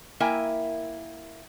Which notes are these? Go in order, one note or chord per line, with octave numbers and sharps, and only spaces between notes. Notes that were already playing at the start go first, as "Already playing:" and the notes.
A#3 E4 A#4 E5 G5 G#5